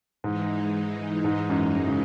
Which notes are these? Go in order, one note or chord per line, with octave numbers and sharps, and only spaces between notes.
G#2 E3 G#3 D#4
G#2
F#2
F#2
C#3